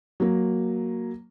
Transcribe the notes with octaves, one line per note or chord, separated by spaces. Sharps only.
F#3 A#3